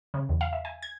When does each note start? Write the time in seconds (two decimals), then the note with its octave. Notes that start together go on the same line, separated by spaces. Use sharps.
0.14 C#3
0.29 E2
0.41 F5
0.53 E5
0.65 G#5
0.83 G#6